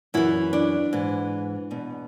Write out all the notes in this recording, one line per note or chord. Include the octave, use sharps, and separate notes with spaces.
F#2 E3 E4
D4
G#2 E3
E2 B2